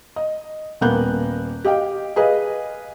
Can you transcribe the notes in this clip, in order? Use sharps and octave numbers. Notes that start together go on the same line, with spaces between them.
D#5
D#1 A#3 B3 F#6 G6
G4 D#5 F5 G5
G#4 B4 D#5 F5